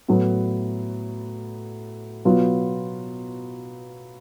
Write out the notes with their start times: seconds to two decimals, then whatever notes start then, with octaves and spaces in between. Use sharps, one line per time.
0.08 A2 F#3 B3
2.25 B2 F#3 B3 F4